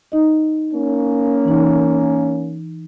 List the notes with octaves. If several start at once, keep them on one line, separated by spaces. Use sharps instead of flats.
D#4 D#5
A#3 C#4
E3 D#4